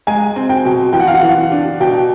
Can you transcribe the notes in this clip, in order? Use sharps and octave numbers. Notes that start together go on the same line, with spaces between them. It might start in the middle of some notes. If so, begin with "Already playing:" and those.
G#3 G#5
C4
G5
B2
E3 G5
F#5
F5
F#5
E3
D4
B2 G5